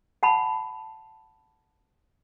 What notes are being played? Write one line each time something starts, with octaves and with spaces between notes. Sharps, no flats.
F#5 A5 B5